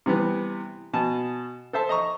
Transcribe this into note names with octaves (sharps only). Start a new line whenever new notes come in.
C3 E3 G3 B3
B2 G#5 A5
A4 C5 E5 A5
D#5 A#5 C#6